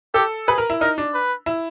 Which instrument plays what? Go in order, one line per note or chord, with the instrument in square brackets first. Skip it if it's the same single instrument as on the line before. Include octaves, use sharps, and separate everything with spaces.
[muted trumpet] G4 [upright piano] A4
[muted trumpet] G#4 [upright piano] B4
[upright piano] A#4
E4
[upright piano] D#4 [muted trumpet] A#4
[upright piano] D4
[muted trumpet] B4
[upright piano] E4